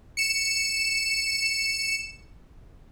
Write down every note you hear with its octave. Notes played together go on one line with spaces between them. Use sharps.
C#7 E7